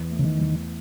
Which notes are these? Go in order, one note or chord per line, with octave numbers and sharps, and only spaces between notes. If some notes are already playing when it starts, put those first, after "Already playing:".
Already playing: E2
A3
C#3
D#3
E2